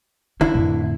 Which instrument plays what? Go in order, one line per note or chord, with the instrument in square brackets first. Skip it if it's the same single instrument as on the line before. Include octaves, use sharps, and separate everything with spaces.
[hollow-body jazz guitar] D3 E4 [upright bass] C#4
[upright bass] F2 A2